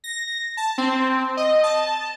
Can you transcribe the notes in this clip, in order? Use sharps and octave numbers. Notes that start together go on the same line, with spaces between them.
A#6
A5
C4
D#5
A5